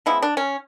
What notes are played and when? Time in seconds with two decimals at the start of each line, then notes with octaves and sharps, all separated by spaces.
0.06 C#3 F3 G#3 B3 E4
0.22 D4
0.37 C#4